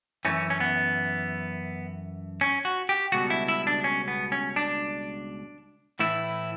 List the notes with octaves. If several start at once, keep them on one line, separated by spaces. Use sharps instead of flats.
F#2 E3 A3 C#4
C#4
B3
C#4
F#4
G4
C#2 B2 G3 B3 F#4
E4
E4
D4
C#4
B3
C#4
D4
A2 E3 A3 E4